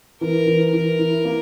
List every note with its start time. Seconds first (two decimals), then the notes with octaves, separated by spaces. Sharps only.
0.21 E3 A#4
0.47 E3
0.73 E3 A#4
0.99 E4
1.25 A#3